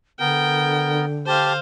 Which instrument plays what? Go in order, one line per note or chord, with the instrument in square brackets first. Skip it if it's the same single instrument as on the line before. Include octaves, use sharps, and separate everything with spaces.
[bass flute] D3 [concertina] B3 A#4 [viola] G5
[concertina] G4 A5 [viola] C5 F5